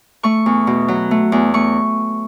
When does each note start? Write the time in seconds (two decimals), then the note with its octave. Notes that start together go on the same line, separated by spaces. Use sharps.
0.23 A3 C#6
0.46 E2
0.67 B2
0.88 F#3
1.11 A3
1.32 E2
1.54 A3 C#6